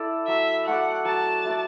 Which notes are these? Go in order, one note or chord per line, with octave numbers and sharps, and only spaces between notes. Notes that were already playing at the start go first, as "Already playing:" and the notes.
Already playing: E4 A4 D5
F#3 E5
A3 F#4 D5 F#5
F#3 A5
A3 F#4 D5